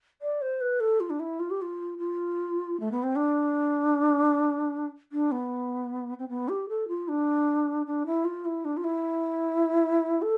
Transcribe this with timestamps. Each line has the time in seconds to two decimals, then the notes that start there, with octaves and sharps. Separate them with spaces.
0.22 D5
0.41 C5
0.61 B4
0.80 A4
1.00 F4
1.10 D4
1.20 E4
1.40 F4
1.50 G4
1.62 F4
1.98 F4
2.80 A3
2.92 B3
3.03 C4
3.16 D4
5.12 D4
5.31 B3
6.19 C4
6.29 B3
6.49 G4
6.69 A4
6.88 F4
7.08 D4
7.86 D4
8.06 E4
8.25 F4
8.45 E4
8.65 D4
8.77 F4
8.84 E4
10.22 A4